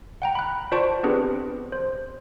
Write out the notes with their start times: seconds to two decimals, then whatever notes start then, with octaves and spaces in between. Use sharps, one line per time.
0.22 F#5 G5 A#5
0.35 B5 F#6
0.72 F4 C5 D5 A5 C#6 D7
1.03 B3 C4 D4 G4 G#4 B4
1.72 C5